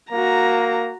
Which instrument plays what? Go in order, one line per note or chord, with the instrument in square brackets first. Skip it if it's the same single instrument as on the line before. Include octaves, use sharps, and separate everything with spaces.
[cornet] A#3 [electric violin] F#4 A#5